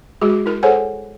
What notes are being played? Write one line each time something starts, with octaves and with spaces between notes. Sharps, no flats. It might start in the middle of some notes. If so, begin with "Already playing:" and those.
G#3 F#4 G#4
E4 A#4
G#4 A4 C5 C#5 F#5 G#5